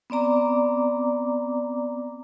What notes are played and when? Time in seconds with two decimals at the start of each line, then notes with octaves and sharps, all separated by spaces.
0.10 B3 C4 D5 A#5 D6